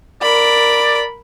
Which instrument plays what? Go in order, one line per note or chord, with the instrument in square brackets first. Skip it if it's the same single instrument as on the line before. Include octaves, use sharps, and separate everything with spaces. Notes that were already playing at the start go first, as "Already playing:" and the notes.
[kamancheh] A#4 B5 [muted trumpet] D5